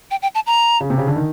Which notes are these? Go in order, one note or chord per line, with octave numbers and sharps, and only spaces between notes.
G5
G5
A5
A#5
C#3
C3
C#3
D3
D#3